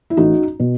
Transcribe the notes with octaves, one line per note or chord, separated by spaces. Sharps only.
E4
A1 A2 E3 D#4 F#4
B2